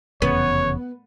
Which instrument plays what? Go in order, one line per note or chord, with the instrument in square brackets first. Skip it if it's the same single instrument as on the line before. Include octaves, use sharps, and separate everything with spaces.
[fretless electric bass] F1 E2 C#3 [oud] B3 [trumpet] C#5